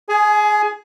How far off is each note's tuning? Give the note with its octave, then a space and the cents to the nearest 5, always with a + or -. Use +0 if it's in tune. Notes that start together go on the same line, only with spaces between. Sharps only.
G#4 +0 G#5 +25